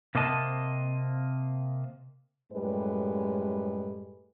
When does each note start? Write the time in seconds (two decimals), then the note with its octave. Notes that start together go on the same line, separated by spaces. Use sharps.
0.15 C3 A#3 C4 D#5 A5
2.52 F#2 A2 G3 G#3 A4 B4